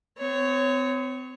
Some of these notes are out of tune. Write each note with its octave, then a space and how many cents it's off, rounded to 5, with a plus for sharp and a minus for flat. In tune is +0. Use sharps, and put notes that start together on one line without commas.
C4 -40 C#5 +0